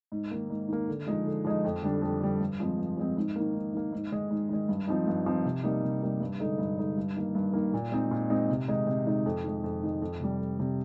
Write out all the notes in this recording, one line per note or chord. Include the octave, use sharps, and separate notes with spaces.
G#2
D#3 A#3
G#2
D#3 A#3
D3
F3 G#3 D#4
D3
F3 G#3 D#4
F2
D3 G3 D4
F2
D3 G3 D4
G2
F3 G#3 C4
G2
F3 G#3 C4
G#2
D#3 A#3
G#2
D#3 A#3
G#2
D#3 G#3
G#2
D#3 G#3
G2
F3 C4 D#4
G2
F3 C4 D#4
C3
G3 A#3 D#4
C3
G3 A#3 D#4
G2
D3 G#3 D#4
G2
D3 G#3 D#4
G2
D#3 A#3
G2
D#3 A#3
A#2
G#3 C4 D#4
A#2
G#3 C4 D#4
C3
D#3 G#3 D#4
C3
D#3 G#3 D#4
F2
D#3 G#3
F2
D#3 G#3
F2
C3 G3
F2
C3 G3